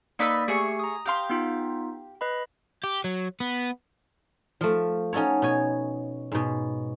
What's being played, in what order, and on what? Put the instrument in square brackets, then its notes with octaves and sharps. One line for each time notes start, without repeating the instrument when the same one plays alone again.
[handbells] A#3 D5 B6 [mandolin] D#4 B4 E6
[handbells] A3 G4 C#7 [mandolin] G#4 E5 C#6
[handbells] A#5 D#6
[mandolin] G4 F5 C6
[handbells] B3 D#4 F4
B4 D#5 B5
[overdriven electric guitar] G4
F#3
B3
[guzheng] F3 A3
C#4 D#4 F#4 A4 C#5
B2 C#5 G#5
G#2 B2